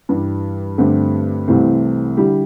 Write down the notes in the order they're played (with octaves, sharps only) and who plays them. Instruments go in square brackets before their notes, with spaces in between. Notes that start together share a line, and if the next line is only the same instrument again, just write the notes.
[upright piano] G2 E3 G3
G2 D3 A3 C4 G4
C2 C3 E3 A3 C4
D3 G3 E4 G4